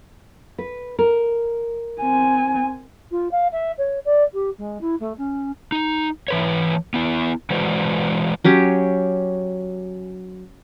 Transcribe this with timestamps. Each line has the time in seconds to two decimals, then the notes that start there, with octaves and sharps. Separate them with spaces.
0.58 B4
0.99 A#4
2.01 C4 G#5
3.11 F4
3.31 F5
3.52 E5
3.78 C#5
4.05 D5
4.33 G4
4.58 G#3
4.81 E4
5.00 A3
5.18 C#4
5.72 D#4
6.28 E3 B4 C#5
6.94 B3 E4
7.50 E3 G#3 F#4 B4 C5 D5
8.45 F#3 C#4 G4